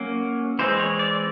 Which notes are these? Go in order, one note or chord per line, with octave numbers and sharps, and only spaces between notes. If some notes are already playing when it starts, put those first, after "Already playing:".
Already playing: F#3 A#3 C#4
E3 G#3 C4 C5
C#5
D5